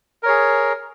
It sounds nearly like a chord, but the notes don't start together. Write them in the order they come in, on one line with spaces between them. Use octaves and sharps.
A#4 C#5 G#4